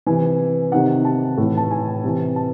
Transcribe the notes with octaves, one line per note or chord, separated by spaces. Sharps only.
C3 E3 G#5
C3 D#3 F#5
A5
A2 E3
A5
G#5
C3 E3
A5